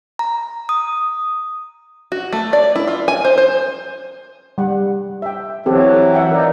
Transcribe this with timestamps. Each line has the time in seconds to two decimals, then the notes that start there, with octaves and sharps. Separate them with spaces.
0.19 A#5
0.69 D#6
2.12 F#4
2.33 A3
2.53 D5
2.76 E4
2.87 F4
3.08 G#5
3.25 C5
3.38 C5
4.58 G3 F#5
5.22 E5 G5
5.66 E3 F#3 C4 G4 A4
6.14 E5 F#5 G5
6.31 E3 D#4 A#4 D5